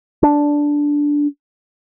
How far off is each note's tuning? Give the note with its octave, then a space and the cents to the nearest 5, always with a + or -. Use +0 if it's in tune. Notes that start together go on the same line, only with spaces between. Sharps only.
D4 -5